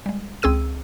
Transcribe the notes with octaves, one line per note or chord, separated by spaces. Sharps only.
G3 G#3
C#2 C4 G#4 E6 D#7